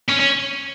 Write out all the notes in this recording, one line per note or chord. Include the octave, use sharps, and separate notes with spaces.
C#4
C#4